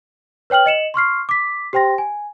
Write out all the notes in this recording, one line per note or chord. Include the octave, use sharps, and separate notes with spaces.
B4 C#5 G5 F6 F#7
D#5 C#7 E7 F#7
C6 C#6 F6 C7
D6 B6
G4 C5 G5 C6 A#6
G#5